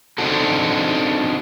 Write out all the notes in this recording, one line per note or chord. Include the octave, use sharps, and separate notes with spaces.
C4 D4 D#4 F#4 A4